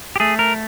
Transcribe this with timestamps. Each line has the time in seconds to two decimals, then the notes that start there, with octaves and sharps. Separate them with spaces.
0.16 G4
0.20 A3 G#4
0.39 A#4